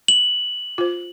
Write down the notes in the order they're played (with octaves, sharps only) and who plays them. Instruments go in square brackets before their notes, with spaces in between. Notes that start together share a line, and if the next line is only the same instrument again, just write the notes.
[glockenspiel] F#7
[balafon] F4 C5